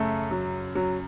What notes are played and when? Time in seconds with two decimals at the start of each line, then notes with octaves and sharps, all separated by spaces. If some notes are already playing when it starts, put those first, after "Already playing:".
Already playing: F#2 C#3 A3
0.31 F#3
0.75 F#3